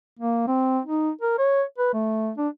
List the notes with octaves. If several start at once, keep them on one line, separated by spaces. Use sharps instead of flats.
A#3
C4
D#4
A#4
C#5
B4
A3
D4